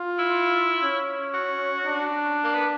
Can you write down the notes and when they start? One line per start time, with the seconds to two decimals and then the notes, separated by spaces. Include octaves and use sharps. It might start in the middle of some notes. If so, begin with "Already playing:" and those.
Already playing: F4
0.19 E4
0.82 C#4
1.34 F#4
1.85 D4
2.44 A#3
2.54 B3